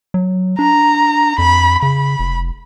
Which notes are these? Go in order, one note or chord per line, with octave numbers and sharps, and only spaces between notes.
F#3
D4 A#5
F2 B5
C#3 B5
F1